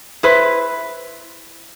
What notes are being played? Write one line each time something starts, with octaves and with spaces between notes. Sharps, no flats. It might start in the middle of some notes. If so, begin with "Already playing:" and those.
E4 B4 C5